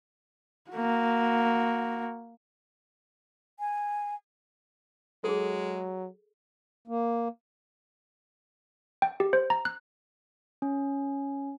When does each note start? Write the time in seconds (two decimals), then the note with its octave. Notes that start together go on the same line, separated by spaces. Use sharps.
0.71 A#3 F#4
3.60 G#5
5.24 F#3 G#3 G#4 A4
6.88 A#3
9.02 G5
9.20 G4
9.33 C5
9.50 A#5
9.65 F#6
10.62 C#4